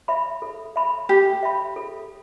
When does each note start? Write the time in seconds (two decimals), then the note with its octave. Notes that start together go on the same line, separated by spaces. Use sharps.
0.08 E5 B5
0.42 A4
0.76 E5 B5
1.09 G4 A4
1.43 E5 B5
1.76 A4